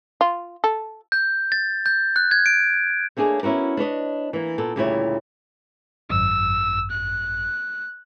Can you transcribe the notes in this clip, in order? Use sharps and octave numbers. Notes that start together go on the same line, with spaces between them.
F4
A4
G6
A6
G6
F#6
G#6
D7
A3 A#3 D4 G#4 C#5
B3 C#4 E4 F#4 A#4
D4 B4 C#5 D#5
E3 A#3
A#2 B3 A4
D2 A#2 C#3 G3 E4 C#5
G#1 F#2 E6
F#6